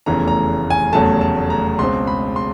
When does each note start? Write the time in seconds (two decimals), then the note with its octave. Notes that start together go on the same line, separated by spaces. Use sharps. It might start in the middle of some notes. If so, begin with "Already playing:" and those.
0.06 F1 E2 C#3 E3 A3 A#5
0.28 A#5
0.70 G#5
0.92 F1 E2 C#3 F#3 A3 A5
1.21 A5
1.50 A#5
1.79 C#2 B2 G#3 C4 C6
2.07 B5
2.36 C6